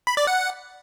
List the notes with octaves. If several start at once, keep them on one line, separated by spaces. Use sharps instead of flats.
B5
D5
F#5